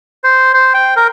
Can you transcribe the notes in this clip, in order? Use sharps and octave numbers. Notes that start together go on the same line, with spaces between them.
C5
C5
G5
A#4